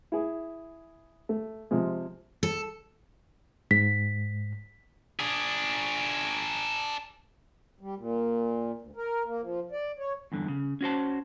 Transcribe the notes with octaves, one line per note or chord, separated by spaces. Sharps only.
E4 G#4
A3
C3 F3 G#3
A4
G#2 B6
D4 G#4
G3
A#2
D2
A#4
A#3
F3
D5
C#5
E2 G2 D3
C#3
C#4 F#4 C5 A5